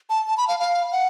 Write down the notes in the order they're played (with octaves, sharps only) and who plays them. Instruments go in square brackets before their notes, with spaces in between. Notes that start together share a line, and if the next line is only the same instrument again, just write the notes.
[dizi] A5
A5
B5
F5
F5
F#5